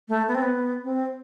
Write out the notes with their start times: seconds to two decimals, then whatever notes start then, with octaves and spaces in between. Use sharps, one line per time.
0.09 A3
0.28 B3
0.35 C4
0.42 B3
0.84 C4